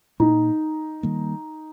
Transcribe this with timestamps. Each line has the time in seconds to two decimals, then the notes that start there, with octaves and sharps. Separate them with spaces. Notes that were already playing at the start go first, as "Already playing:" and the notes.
0.20 A#2 A#3 D#4
1.03 D#3 G3 A#3